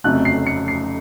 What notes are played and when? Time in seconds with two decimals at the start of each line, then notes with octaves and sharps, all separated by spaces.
0.04 F1 F2 C#3 F#3 A3 F#6
0.25 C7
0.47 C#7
0.68 C7